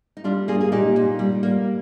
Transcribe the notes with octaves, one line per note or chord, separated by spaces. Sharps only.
D#4
G3 D4 F4
A#3 F4 G#4
G#4
A#2 D#4 G4
A#2
G3
A#3